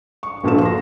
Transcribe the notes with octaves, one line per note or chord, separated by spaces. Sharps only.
C#6
G1 A#2 F3 F#4 A4 E7
C6 A#6